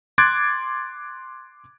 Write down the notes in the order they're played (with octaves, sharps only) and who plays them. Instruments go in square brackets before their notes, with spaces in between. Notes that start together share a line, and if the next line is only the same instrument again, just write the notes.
[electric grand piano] C6 D6 F#6 G#6 A6 D7